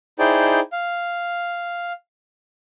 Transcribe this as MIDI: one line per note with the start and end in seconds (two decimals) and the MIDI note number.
0.19 0.60 63
0.19 0.60 64
0.19 0.60 68
0.19 0.60 72
0.19 0.60 74
0.19 0.60 79
0.72 1.93 77